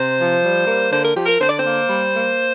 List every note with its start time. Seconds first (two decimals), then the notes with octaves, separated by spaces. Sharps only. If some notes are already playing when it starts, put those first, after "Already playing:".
Already playing: C3 C5
0.19 F3
0.42 G3
0.67 A#3
0.91 D3 C5
1.03 A#4
1.15 F3 G4
1.26 A#4
1.40 D3 C5
1.49 D5
1.57 C5
1.65 A#3
1.89 G3
2.15 A#3